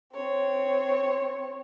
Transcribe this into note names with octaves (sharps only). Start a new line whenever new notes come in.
C4 C#5